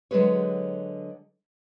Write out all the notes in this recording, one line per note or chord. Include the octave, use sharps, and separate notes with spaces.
D3 F#3 G#3 G#4 B4 C#5